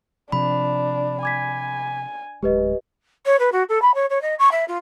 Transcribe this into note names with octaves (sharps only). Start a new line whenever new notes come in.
C3 F3 D4 B5
G#5 D6 G#6 B6
D1 G#3 G4 B4 D#5
C#5
B4
F#4
A4
B5
C#5
C#5
D#5
C#6
E5
F4